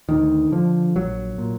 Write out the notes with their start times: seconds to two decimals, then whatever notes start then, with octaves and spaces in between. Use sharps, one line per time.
0.09 D2 D#3
0.52 D3 F3
0.96 A#1 F#3
1.38 A#2